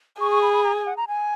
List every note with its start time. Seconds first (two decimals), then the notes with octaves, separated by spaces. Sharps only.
0.20 G#4 C#6
0.31 C#6
0.42 B5
0.53 B5
0.64 A#5
0.75 G#5
0.86 F#5
0.97 A#5
1.08 G#5